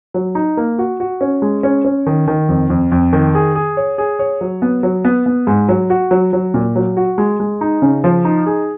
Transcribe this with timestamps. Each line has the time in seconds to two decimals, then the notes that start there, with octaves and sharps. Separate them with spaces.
0.14 F#3
0.35 D#4
0.57 A#3
0.78 F#4
1.00 F#4
1.21 C#4
1.42 G#3
1.63 C#4
1.85 C#4
2.06 D#3
2.28 D#3
2.49 F2
2.70 F2
2.92 F2
3.13 D#3
3.35 G#4
3.55 G#4
3.77 C#5
3.98 G#4
4.19 C#5
4.41 F#3
4.62 B3
4.83 F#3
5.05 B3
5.26 B3
5.47 G#2
5.69 F#3
5.90 F#4
6.11 F#3
6.33 F#3
6.54 A#2
6.76 F#3
6.97 F#4
7.18 G#3
7.40 G#3
7.61 D#4
7.82 C#3
8.04 F3
8.25 D#4
8.46 G#4